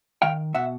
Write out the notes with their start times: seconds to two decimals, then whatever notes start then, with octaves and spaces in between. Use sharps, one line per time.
0.22 D#3 F5 G5
0.55 B2 E5 F#5